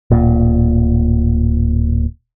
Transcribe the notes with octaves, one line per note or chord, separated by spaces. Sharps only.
D1 A#2